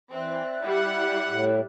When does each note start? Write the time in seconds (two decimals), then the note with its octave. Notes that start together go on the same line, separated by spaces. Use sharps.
0.12 E3 C4 D5 E5 F#6
0.63 G3 E4 F#5
1.29 A2